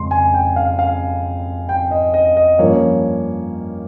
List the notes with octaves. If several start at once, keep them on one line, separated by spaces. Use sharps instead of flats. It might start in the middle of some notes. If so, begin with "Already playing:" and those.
Already playing: F2 C#3 G#3 C6
G#5
G5
F5
F5
G5
D#5
D#5
D#5
G2 F3 A#3 C#4 C#5